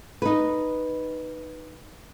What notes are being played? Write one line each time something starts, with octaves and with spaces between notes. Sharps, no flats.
D#4 B4